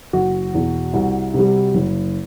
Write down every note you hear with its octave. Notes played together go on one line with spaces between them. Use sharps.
F#1 F#4
E2 B2
C2
C3 G3
F#1